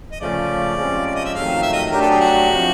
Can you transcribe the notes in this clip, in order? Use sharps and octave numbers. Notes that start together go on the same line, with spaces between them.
D#5
C#3 F3 A3 C#4 D5
C3 F3 G#3 C#4
D5
D#5
E5
F2 C3 D#3 F#3 A3 F5
E5
D#5
F#3 A3 D4 G4 A#4
A4
G#4
F#4
C3 F3